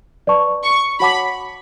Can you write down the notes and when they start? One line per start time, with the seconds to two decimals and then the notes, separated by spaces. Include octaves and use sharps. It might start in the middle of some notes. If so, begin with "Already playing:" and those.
0.27 B4 D5 A5 C#6
0.64 C#6
1.00 F#4 C#5 F#5 A5 B5 D6